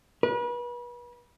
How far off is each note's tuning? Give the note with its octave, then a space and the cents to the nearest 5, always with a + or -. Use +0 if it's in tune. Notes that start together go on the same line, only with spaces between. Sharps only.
B4 -35